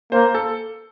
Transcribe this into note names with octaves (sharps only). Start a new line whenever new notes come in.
A#3 C5
A4